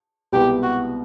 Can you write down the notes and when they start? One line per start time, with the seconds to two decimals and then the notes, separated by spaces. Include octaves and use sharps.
0.33 C2 B2 G#3 B3 E4 G4
0.63 F#4